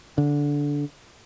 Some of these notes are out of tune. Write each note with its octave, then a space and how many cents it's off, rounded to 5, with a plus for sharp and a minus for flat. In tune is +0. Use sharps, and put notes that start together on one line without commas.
D3 -15